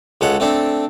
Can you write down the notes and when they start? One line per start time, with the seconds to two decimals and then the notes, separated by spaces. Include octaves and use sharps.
0.21 C#2 G#3 A4 C#5 F#5
0.40 A3 C4 D4 A4